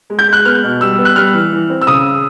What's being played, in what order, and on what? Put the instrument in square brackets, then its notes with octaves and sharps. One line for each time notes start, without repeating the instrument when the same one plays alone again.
[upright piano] G#3
G6
G#3 F#6
B3 F6
B2
G3 E6
B3
F#6
G3 F6
E3
E3
C4
E6
C#3 D#6